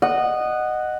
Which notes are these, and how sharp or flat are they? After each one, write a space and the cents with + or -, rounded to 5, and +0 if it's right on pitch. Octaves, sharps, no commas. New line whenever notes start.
D#5 -15 F#5 +0